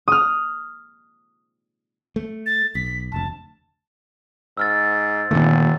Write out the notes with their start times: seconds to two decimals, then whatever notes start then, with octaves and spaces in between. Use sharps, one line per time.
0.08 D#6 F6
2.16 A3
2.46 A6
2.75 B1 B6
3.12 F1 D2 A5
4.57 G#2 E6 F6 A6
5.31 F1 A#2 D3 D#3 A3